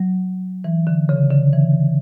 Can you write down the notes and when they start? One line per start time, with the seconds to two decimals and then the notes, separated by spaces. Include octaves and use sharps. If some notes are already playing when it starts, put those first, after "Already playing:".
Already playing: F#3
0.64 E3
0.87 D3
1.09 C#3
1.30 D3
1.53 E3